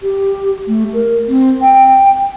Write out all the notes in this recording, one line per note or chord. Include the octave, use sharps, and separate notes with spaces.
G4
A3
A#4
C4
G5